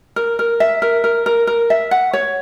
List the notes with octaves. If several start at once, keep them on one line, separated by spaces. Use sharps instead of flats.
A#4
A#4
E5
A#4
A#4
A#4
A#4
E5
F#5
C#5